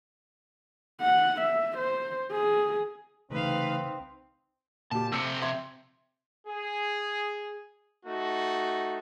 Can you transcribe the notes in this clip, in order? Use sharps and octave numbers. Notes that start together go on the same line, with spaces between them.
F#5
E5
C5
G#4
C2 C#3 E3 A3 C4 D#4 B4 F5
A#2 G4 A5
F2 C3 E6 G6 C#7
E5 C6 G#6
G#4
A3 D#4 F#4